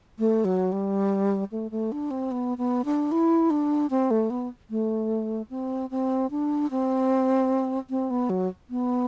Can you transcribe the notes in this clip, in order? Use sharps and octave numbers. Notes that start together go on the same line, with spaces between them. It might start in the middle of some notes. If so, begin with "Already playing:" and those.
A3
F#3
G3
A3
A3
D4
C4
B3
B3
D4
E4
D4
C4
A3
B3
A3
C4
C4
D4
C4
C4
B3
F#3
B3